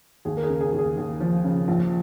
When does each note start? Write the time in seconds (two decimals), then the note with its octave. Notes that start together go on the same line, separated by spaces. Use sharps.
0.25 D#2 G#4
0.37 A#4
0.43 G#4
0.49 C#3
0.61 G#4
0.73 D#2
0.78 G#4
0.97 D#2
1.20 F3
1.44 C#3
1.68 A#1